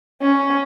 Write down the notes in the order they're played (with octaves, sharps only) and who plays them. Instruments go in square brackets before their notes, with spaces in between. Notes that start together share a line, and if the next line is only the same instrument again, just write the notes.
[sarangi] C#4